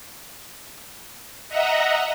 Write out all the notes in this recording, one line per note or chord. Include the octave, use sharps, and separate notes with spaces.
D#5 E5 F#5 A#5